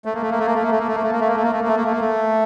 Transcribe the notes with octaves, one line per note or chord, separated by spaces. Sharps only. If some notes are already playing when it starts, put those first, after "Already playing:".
A3
A#3
A3
A#3
A3
A#3
A3
A#3
A3
A#3
A3
A#3
A3
A#3
A3
A#3
A3
A#3
A3
A#3
A3
A#3
A3
A#3
A3